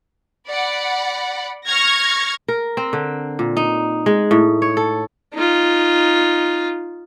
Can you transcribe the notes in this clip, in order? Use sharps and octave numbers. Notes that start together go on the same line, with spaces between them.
D5 F#5 B5
C#6 F6 G#6 A#6
A#4
C4
D3
A#2
D#4
G#3
A2
C#5
A4
D#4 F4